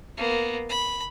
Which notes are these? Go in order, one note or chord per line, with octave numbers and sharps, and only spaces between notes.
A#3 B3
B5